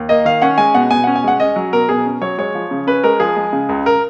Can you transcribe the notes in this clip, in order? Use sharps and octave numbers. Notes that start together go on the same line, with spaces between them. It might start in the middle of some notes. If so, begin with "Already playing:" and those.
Already playing: D#2
A#3 D#5
D#3 F5
C#4 F#5
G#3 G#5
B2 F#5
B2 G#5
C#4 F#5
G#5
G#3 F#5
C#4 D#5
F#3
B2 A#4
B2 G#4
C#4
F#3 C#5
G#3 C#5
F3
C#3
C#4 B4
G#3 A#4
F3 G#4
G#3
C#3
C#2
A#4